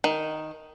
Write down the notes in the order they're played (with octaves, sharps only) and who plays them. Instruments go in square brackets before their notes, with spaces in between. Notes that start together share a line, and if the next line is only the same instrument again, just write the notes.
[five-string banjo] D#3